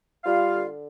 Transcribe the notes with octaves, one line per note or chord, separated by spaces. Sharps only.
G3 F4 F5
D3